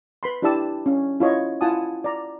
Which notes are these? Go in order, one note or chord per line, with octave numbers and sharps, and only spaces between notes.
B4 B5 C6
D4 E4 G4 D5 A5 E6
C#4 F5
E4 F4 C#5 D#5
E4 F4 F#5 G#5 A5 D#6
D5 A#5